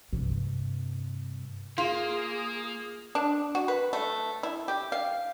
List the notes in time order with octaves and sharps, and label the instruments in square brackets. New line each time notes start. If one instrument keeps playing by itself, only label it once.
[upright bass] G2 C3
[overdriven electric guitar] A#3 [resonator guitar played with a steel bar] F4 [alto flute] G#4
[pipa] D4
F#4
B4
A3
E4
G4
F5